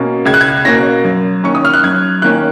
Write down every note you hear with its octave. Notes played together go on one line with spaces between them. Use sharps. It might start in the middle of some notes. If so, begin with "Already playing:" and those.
Already playing: B2 A#3 C#4
C#2 G#6
F#6
G#6
B2 A#3 C#4 A#6
F#2
D#3 A#3 C#4 C#6
D#6
F6
F#6
F#2 G#6
D#3 A#3 C#4 F#6